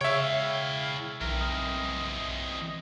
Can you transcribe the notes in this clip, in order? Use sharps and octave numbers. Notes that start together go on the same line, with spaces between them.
C#3 E4 C#5 E5 F5 G5
B1 E3 C4 A#4
D#5